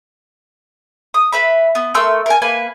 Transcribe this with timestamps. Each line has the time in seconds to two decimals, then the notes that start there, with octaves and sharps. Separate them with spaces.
1.14 D#6
1.32 B4 E5 B5
1.75 B3
1.94 A3 A#4 C6 E6
2.26 A#4 G#5
2.42 A#3 B4 G#5